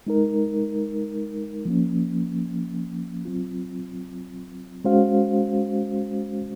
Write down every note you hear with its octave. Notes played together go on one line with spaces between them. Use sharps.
G#3 D#4 A#4
F3 A#3 C#4
F#3 C4 F4
G#3 C#4 F#4 C5 F5